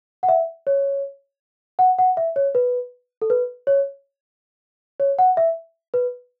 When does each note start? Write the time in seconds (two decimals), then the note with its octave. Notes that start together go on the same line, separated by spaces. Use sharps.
0.23 F#5
0.29 E5
0.67 C#5
1.79 F#5
1.99 F#5
2.17 E5
2.36 C#5
2.55 B4
3.22 A4
3.30 B4
3.67 C#5
5.00 C#5
5.19 F#5
5.37 E5
5.94 B4